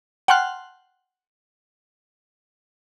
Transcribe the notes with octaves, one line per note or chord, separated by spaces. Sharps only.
F#5 G5 A5 C6 F6 F#6